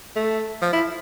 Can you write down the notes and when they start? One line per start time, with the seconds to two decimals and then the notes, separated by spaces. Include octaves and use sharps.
0.16 A3
0.61 F3
0.73 E4